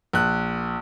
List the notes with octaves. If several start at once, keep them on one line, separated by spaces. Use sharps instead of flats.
A#1 F#6